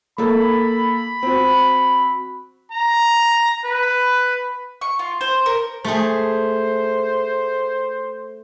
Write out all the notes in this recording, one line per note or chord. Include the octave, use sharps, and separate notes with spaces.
A#3 A4 B5
C4 F#4
A#5
B4
C#6
F4
C5
A#4
A3 G#4 C5